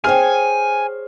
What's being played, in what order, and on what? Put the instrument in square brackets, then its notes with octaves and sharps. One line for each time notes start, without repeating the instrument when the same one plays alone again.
[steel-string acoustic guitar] G#4 C5 C#5 [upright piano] G5 F6 [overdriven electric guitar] G#5